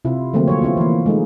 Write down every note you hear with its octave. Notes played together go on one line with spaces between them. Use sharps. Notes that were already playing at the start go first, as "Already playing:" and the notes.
C3 E4 F4
D3 F3 F#3 A3 A#3 C4
F#3 F4 C#5
B3 C4 E4 F4
E3 A#3
G#3 A3 D#4